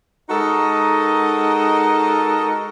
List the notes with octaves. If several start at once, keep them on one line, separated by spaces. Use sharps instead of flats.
G#3 D#4 F#4 A4 A#4 D#5